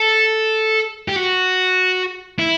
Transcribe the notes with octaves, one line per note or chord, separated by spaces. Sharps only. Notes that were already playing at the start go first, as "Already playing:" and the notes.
Already playing: A4
G4
F#4
E4